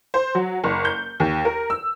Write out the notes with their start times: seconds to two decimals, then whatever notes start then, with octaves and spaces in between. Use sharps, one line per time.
0.14 C5
0.35 F#3
0.64 F#1
0.85 G6
1.20 D#2
1.45 A#4
1.70 E6